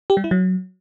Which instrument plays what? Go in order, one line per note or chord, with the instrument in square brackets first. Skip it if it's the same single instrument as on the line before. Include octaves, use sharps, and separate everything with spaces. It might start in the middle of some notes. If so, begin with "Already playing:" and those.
[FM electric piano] G4
G3
E4
F#3